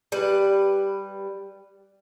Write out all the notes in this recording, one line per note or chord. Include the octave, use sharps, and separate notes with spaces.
G3 B4